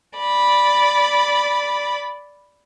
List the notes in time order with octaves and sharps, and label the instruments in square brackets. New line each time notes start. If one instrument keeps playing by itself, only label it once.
[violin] D5 B5